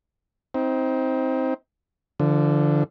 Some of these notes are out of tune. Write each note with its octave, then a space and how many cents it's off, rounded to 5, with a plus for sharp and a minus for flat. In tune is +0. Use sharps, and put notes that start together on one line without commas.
C4 +0 D#4 +35
D3 +0 F3 -35